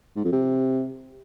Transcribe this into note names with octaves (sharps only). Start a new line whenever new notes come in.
G#2
F2
C3